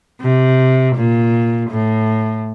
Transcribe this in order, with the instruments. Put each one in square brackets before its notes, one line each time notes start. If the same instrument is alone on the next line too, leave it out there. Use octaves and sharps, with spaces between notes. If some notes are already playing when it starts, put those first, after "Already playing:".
[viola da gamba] C3
A#2
A2